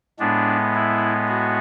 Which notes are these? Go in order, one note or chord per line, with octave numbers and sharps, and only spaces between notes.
A2 G#3 B3 D4
E4
F#4